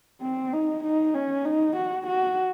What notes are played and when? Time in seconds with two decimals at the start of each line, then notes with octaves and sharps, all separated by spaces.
0.22 C4
0.53 D#4
0.84 D#4
1.14 C#4
1.45 D#4
1.76 F#4
2.07 F#4